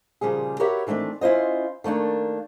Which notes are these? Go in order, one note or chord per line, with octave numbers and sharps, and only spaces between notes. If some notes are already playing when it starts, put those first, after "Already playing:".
A#2 C#3 F3 G3 G#4
F#4 G4 A#4 B4 C#5 E5
D#3 E3 A3 C4 D4
C#4 E4 F4 C5 D#5
D#3 A3 A#3 D4